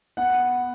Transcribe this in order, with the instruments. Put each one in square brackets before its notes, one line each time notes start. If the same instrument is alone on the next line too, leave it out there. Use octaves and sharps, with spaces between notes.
[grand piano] B3 F#5